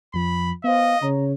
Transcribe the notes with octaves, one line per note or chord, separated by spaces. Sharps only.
F2 F3 B5
B3 C5 D#5 F5
C#3 C#5 A#5